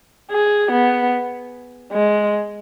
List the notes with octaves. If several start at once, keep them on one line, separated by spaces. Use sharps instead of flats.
G#4
B3
G#3